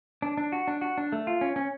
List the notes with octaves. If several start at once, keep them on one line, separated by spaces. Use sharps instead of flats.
D4
D4
F#4
D4
F#4
D4
A3
F4
C#4
C#4